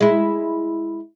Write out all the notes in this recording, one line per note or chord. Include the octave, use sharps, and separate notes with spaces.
G#3 E4